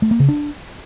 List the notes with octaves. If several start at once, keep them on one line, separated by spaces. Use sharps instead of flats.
A3
A#3
C#3
D4